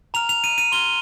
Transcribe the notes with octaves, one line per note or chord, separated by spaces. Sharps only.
A#5 F6 F7
F7
D#7
D#7
C6 F6 G7